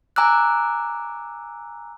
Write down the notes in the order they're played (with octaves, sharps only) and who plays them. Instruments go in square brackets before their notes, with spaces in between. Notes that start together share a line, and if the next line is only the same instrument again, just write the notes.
[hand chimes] G#5 A#5 D6 E6 F#6